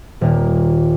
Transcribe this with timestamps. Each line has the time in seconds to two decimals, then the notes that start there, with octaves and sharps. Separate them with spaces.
0.21 D#1 A#2 A#3